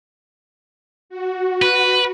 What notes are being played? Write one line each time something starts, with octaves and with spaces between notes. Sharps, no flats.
F#4
B4